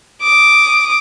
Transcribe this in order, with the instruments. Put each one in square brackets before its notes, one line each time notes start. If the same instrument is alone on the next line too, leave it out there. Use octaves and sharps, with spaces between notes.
[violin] D6 D#6